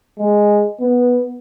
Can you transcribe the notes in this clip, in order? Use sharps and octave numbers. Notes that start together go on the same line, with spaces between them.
G#3
B3